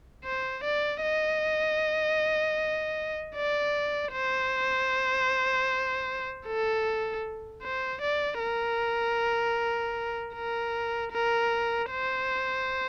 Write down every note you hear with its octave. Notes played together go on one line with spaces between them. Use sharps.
C5
D5
D#5
D5
C5
A4
C5
D5
A#4
A#4
A#4
C5